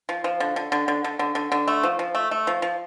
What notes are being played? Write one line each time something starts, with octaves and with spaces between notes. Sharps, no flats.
F3
F3
D3
D3
D3
D3
D3
D3
D3
D3
A3
F3
F3
A3
A3
F3
F3